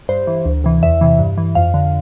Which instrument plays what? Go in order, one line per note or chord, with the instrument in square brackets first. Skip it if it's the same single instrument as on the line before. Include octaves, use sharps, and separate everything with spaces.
[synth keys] G2 C5
E3
D2
C3 E3
E2 E5
C3 E3
G2
E3
F2 F5
D3